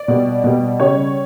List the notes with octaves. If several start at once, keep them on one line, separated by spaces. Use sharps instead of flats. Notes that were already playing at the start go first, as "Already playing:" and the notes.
Already playing: D5
B2 G3
B2 G3
C#3 G3 C#5